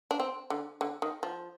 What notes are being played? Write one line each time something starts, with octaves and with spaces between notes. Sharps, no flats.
D4
C4
D3
D3
D#3
F3